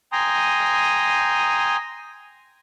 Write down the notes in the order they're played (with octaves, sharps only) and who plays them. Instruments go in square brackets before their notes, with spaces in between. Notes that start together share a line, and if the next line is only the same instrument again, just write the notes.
[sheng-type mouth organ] G5 G#5 A#5 C6 D#6